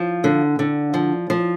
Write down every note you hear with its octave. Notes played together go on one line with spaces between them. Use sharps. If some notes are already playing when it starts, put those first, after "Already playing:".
Already playing: F3
D3
D3
F3
F3